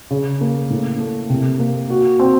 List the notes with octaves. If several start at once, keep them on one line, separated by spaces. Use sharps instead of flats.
C#3
A#3
A2
A3
C3
A#3
F#4
C4